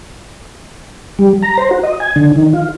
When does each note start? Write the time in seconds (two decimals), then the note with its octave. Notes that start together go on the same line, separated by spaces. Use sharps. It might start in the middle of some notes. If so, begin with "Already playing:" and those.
1.19 G3
1.42 A#5
1.58 C5
1.71 F#4
1.83 D#5
2.00 G#5
2.16 D3
2.36 D#3
2.53 F4